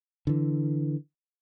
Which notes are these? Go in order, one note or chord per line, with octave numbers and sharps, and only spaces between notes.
D3 E3